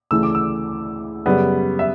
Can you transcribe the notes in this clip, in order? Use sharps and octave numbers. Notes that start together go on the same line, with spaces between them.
D2 C#3 E3 A3 E6
D6
E6
F#2 C#3 G3 B3
E5